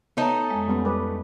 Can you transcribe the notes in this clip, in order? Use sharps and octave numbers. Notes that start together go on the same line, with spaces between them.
A3 B3 D#4 C#5 E5 A5 A#5
F2 G#3
G3 B3 C#4
G3 B4 D6